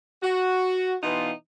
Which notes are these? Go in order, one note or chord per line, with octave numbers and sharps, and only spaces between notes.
F#4
B2 E3 B3 D#4 F4